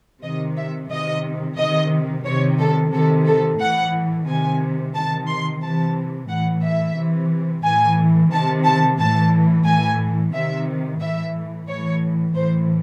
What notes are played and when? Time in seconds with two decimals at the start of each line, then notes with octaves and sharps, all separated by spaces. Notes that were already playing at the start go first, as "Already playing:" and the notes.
0.23 C3 D#3 D#5
0.57 E5
0.90 C3 D#3 D#5
1.57 C3 D#3 D#5
2.25 C3 D#3 C#5
2.59 A4
2.92 C3 D#3 A4
3.26 A4
3.59 A2 E3 F#5
4.27 C3 D#3 G#5
4.94 C3 D#3 A5
5.28 C6
5.62 C3 E3 A5
6.29 A2 E3 F#5
6.63 E5
6.96 C3 E3
7.64 A2 E3 G#5
8.32 C3 D#3 A5
8.64 A5
8.98 A2 E3 A5
9.65 A2 E3 G#5
10.33 C3 D#3 E5
11.00 A2 E3 E5
11.68 A2 E3 C#5
12.35 A2 E3 C5